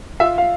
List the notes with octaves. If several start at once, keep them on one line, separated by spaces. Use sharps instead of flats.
F4 E5
F5